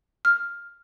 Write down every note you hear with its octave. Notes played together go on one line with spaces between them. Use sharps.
F6